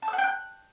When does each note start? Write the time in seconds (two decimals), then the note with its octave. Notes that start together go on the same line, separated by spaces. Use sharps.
0.02 A5
0.08 E6
0.13 F#5
0.18 G5
0.24 F#6